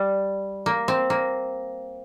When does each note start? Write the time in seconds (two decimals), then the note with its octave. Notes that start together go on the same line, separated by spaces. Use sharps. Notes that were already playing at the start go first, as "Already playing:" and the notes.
Already playing: G3
0.66 A#3
0.88 C4
1.10 A#3